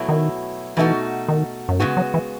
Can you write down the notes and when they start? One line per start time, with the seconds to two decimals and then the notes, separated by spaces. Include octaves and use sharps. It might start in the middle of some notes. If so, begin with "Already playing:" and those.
Already playing: B2 F#3 A3 E4
0.09 D#3
0.77 B2 E3 A3 D#4 F#4
1.28 D#3
1.69 F#2
1.80 G#2 C#3 G#3 B3 F#4
1.97 F#3
2.14 E3